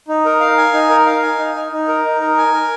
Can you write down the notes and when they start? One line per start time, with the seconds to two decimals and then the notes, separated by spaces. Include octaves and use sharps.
0.08 D#4
0.25 A#4
0.40 F5
0.58 G#5
0.73 D#4
0.89 A#4
1.06 F5
1.22 G#5
1.39 D#4
1.56 D#4
1.72 D#4
1.88 A#4
2.05 D#4
2.21 A#4
2.38 G#5
2.54 A#4